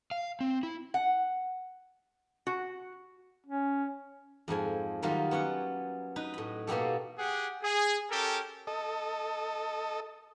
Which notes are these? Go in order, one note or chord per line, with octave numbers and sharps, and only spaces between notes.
F5
C4
E4
F#5
F#4
C#4
F2 G#2 F3 G#5
D#3 F#3 G3 A#3 D#4 F4
B3 C#4 D5 F#5
D#4 B4
A2 B5
B2 A#3 B3 G4 A4
G4 G#4 F#5
G#4
C#4 G4 A4 A#4
A4 D#5